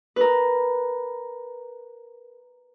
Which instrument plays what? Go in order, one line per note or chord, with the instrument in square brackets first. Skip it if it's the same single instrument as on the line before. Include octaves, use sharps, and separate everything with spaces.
[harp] A#4 B4